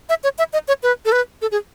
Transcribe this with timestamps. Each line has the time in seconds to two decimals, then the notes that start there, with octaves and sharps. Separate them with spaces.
0.09 E5
0.24 C#5
0.38 E5
0.53 D#5
0.68 C#5
0.83 B4
1.05 A4
1.12 B4
1.42 A4
1.52 G#4